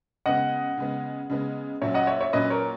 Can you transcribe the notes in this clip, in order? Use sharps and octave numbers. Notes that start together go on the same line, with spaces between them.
C#3 G#3 B3 D#5 F#5
C#3 G#3 B3
C#3 G#3 B3
A#2 F#3 C#4 C#5 E5
D#5 F#5
C#5 E5
C#5 E5
A#2 F#3 C#4 B4 D#5
A#4 C#5